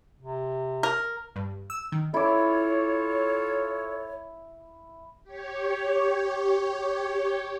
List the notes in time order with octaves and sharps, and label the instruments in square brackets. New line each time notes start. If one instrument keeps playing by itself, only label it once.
[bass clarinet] C3
[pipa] A#4
[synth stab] G2
E6
D#3
[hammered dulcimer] E4 D6 [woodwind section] F4 A4 C#5
[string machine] G4 C#5